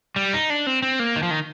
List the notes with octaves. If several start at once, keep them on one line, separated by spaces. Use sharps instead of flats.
G3
D#4
D4
C4
C4
A#3
D#3
F3
D#3